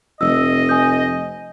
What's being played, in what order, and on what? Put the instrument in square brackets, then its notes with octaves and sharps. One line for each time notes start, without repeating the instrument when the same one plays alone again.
[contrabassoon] F1 [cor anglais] D#5 [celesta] E6
[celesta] G#5 D#6 G6